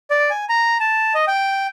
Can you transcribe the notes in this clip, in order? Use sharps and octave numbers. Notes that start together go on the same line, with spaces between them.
D5
G#5
A#5
A5
D#5
G5